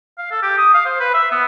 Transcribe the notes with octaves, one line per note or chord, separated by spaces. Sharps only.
F5
A4
G4
D#6
F5
C5
B4
E5
B3